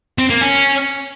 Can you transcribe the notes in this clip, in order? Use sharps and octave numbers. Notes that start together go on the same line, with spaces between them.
C4
A#3
C#4